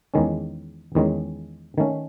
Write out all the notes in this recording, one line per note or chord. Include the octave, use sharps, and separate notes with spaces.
E2 D#3 G#3 C#4
E2 D#3 G#3 C#4
D#3 A3 C#4